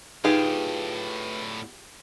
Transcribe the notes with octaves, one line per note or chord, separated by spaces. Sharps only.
A2 D4 D#4 F4 G4 G#4 B4